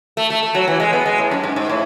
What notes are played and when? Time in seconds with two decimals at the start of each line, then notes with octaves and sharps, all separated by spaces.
0.17 A3
0.30 A3
0.43 A3
0.55 F#3
0.68 E3
0.80 G#3
0.93 B3
1.06 G#3
1.18 A2
1.31 F#2
1.44 G#2
1.56 G#2
1.69 A2